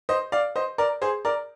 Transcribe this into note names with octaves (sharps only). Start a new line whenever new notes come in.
C5 D#5
D5 F5
C5 D#5
A#4 D5
G#4 C5
A#4 D5